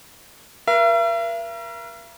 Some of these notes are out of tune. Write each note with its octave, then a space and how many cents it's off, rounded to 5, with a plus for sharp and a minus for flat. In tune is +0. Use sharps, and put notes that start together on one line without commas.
A#4 +35 E5 +45